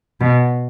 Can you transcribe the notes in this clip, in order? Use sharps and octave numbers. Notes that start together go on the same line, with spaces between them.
B2